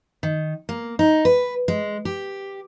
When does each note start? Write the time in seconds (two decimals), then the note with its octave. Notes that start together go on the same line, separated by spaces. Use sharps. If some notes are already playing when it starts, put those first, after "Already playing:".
0.23 D#3
0.69 A#3
0.99 D#4
1.25 B4
1.68 G#3
2.05 G4